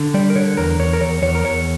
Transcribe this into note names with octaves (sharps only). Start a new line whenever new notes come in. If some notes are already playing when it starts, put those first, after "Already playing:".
Already playing: D3
G3 D5
A#4
D3 C#5
E2 A#4
E2 C#5
A#4
E2 C#5
E2 C#5
A#4
E2 C#5